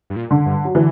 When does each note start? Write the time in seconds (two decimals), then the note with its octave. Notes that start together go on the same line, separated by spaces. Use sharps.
0.10 G2
0.16 A#2
0.31 D3
0.46 G2
0.65 F#3
0.75 D3 E3